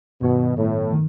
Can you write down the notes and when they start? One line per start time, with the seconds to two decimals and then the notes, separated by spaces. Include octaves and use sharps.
0.22 G2 B2 D#3 F#3 B3
0.57 A2
0.93 D#3